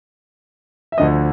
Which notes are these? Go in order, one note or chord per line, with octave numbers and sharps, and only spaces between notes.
E5
D2 D3 F3 D#5